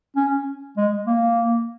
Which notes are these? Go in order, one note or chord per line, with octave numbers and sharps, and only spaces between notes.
C#4
G#3
A#3